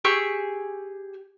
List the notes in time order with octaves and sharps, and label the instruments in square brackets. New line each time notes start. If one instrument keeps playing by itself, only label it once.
[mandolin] G4 G#4 C#6 E6